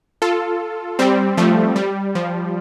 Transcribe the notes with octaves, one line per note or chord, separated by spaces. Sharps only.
F4 A4
G3 C4
F3 A3
G3
F3